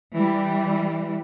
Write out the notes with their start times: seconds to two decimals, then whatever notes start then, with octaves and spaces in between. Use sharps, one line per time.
0.14 E3 G3